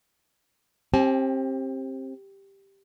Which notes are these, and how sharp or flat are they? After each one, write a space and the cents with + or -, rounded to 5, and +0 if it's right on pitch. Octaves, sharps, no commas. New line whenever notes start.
C4 +25 G4 +0 A5 -45